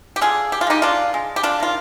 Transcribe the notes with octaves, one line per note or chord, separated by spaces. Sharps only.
G4
D3 F4 G#4
G4
F4
G#3 D#4 G4
D4 F4
G#3
G4
D4 F4
D#3 F4